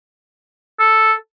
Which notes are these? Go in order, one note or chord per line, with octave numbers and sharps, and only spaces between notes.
A4